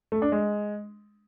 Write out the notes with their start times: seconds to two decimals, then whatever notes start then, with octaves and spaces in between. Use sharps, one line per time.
0.12 A3
0.22 D4
0.32 G#3